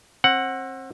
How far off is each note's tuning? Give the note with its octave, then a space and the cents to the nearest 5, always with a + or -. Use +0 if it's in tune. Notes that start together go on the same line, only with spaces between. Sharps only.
C4 +30 F#5 +0